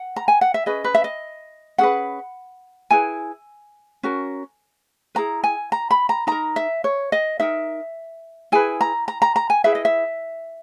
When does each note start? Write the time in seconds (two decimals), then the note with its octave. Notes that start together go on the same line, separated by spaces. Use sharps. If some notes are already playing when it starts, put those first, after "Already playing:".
Already playing: F#5
0.16 A#5
0.28 G#5
0.41 F#5
0.54 E5
0.66 C#4 G#4 B4 D#5
0.84 B4
0.95 E5
1.04 D#5
1.78 C#4 G#4 B4 F#5
2.90 E4 G#4 B4 G#5
4.03 C#4 F#4 A#4
5.15 E4 G#4 B4 A#5
5.44 G#5
5.72 A#5
5.91 B5
6.09 A#5
6.27 D#4 A#4 A#5
6.56 E5
6.84 C#5
7.12 D#5
7.40 D#4 A#4 E5
8.52 E4 G#4 B4 G#5
8.81 A#5
9.08 A#5
9.22 A#5
9.36 A#5
9.50 G#5
9.64 E4 G#4 B4 E5
9.75 D#5
9.85 E5